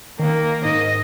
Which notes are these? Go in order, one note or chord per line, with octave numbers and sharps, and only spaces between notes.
D#3 A#3
G#2 D#5